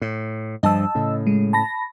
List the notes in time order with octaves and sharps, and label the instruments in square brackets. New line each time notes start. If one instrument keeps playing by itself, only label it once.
[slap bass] A2
[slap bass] G2 F3 [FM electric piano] D#5 A5 E6
[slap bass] A2 C#3
[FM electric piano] G#3
A5 B5 A#6